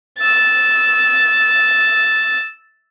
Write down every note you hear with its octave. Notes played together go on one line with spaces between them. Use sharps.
E6 A6